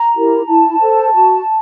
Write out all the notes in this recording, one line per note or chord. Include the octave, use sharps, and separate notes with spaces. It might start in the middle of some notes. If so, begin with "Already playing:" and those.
Already playing: A#5
E4 G4 A#4
E4 A5
A4 C5
F#4